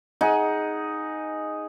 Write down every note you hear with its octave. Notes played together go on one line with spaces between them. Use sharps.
D#4 G#4 F#5